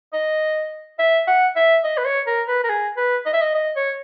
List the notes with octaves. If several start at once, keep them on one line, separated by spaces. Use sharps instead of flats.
D#5
E5
F#5
E5
D#5
B4
C#5
A#4
B4
A#4
G#4
B4
D#5
E5
D#5
D#5
C#5